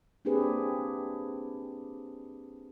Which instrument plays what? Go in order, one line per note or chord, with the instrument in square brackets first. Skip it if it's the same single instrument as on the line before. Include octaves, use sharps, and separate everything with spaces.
[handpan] A#3 C4 D4 G4 G#4 B4